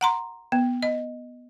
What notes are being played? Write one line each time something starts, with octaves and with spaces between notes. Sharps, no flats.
F#5 A#5 C6
B3
D#5